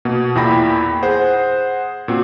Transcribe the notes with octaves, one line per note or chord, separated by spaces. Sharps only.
B2 A#3
E2 A#2 E4 G5 B5 A#6
G#4 C5 F#5
A#2 C4 F#4